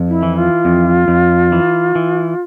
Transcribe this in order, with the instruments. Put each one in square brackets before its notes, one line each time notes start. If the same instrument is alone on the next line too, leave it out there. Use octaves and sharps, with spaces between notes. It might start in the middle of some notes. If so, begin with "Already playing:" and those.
Already playing: [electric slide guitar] F2
[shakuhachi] E4
[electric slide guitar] E3
[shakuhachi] F4
[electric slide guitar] F2
F2
E3
E3